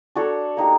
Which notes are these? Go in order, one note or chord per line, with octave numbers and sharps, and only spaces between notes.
D4 F#4 A4 C#5
A#3 D#4 G4